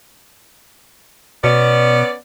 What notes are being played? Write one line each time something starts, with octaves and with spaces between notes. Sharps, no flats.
B2 B3 C#4 D5